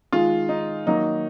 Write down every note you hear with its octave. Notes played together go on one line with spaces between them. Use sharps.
D#3 G#3 F4
D#4
D#3 F#3 A#3 D#4